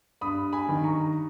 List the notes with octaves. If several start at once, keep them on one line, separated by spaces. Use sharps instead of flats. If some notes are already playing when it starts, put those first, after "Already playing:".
G2 B5 D#6
G#5 B5
D#3
A#5 C#6